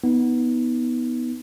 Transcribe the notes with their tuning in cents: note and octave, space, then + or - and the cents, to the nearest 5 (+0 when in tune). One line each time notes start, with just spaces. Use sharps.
B3 +0 D#4 +25